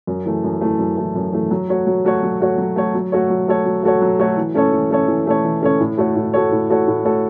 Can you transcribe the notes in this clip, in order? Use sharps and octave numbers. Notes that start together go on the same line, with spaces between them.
F#2
E3 A3
F#2
E3 A3
F#2
E3 A3
F#2
E3 A3
F#3
A3 F#4 C#5
F#3
A3 F#4 C#5
F#3
A3 F#4 C#5
F#3
A3 F#4 C#5
F#3
A3 F#4 A4 C#5
F#3
A3 F#4 A4 C#5
F#3
A3 F#4 A4 C#5
F#3
A3 F#4 A4 C#5
E3
A3 C#4 A4 C#5
E3
A3 C#4 A4 C#5
E3
A3 C#4 A4 C#5
E3
A3 C#4 A4 C#5
A2
A3 F#4 A4 C#5
A2
A3 F#4 A4 C#5
A2
A3 F#4 A4 C#5
A2
A3 F#4 A4 C#5